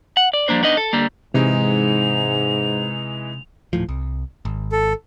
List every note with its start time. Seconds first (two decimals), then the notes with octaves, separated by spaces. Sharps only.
0.17 F#5
0.33 D5
0.48 F3 G3 A#3 D4 C5
0.63 B3 D4 D#4 D#5
0.77 A4
0.93 D3 G3 A#3
1.34 G#2 C3 E3 G#3 D#4 F7
3.73 D#1 A2 F3
3.89 C2
4.45 G#1
4.72 A4